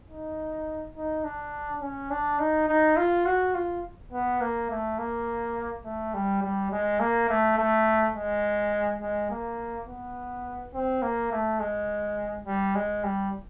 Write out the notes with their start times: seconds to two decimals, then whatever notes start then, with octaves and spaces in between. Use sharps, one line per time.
0.09 D#4
0.96 D#4
1.24 D4
1.81 C#4
2.10 D4
2.39 D#4
2.68 D#4
2.97 F4
3.26 F#4
3.55 F4
4.12 B3
4.41 A#3
4.70 A3
4.98 A#3
5.85 A3
6.14 G3
6.43 G3
6.71 G#3
7.00 A#3
7.29 A3
7.57 A3
8.15 G#3
9.01 G#3
9.30 A#3
9.88 B3
10.74 C4
11.02 A#3
11.32 A3
11.60 G#3
12.47 G3
12.75 G#3
13.04 G3